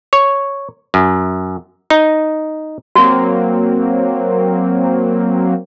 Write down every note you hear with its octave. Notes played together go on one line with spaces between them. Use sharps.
C#5
F#2
D#4
F#3 A#3 C4 F#4